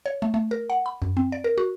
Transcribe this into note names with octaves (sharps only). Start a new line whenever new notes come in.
C#5
A3
A3
A#4
F#5
B5
F#2
C4
D5
A#4
F#4